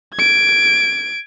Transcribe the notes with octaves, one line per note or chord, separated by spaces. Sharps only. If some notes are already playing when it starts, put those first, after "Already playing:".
G#6 D7